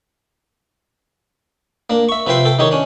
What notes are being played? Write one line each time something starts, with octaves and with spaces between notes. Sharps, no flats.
A#3 D4
E5 C#6
C3 F3 B4 E5 G5 C6
A4 G5
D#3 D#4 G4 C#5
C#4 D4